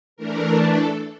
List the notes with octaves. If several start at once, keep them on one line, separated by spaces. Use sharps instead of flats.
E3 A3 D4 A#4
A4